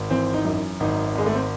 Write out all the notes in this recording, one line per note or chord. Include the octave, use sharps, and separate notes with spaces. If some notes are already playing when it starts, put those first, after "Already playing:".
Already playing: G#1
E3 C4
D#4
F#2
G#1 D#4
G#1 G#3
A3
C4